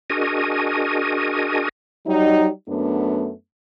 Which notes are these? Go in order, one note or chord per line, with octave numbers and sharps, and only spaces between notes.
D4 F#4 G#4 A#4 D#5 G#5
F#3 G3 D#4
F#2 A3 B3 D4